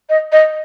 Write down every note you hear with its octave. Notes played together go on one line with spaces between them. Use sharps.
D#5
D#5